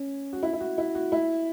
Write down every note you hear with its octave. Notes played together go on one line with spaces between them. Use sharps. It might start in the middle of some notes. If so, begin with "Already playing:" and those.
Already playing: C#4
F#4
E4
E4
F#4
E4
F#4
E4